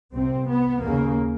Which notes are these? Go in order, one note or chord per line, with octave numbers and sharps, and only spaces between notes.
C2 C3 C4
B3
D#2 C#3 A#3